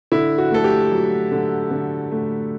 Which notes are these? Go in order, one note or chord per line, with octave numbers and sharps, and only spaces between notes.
D3 E4
F#4
A3 A4
G4
F#3
D3
D3
A3